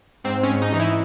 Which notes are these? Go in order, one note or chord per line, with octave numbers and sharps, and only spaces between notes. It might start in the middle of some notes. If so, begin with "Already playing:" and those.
G#2 C4
C#4
G#2
D#4
E3 D#4
E4